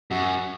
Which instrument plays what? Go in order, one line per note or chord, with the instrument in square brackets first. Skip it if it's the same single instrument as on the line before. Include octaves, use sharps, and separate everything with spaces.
[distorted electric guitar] F#2 [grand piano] F#4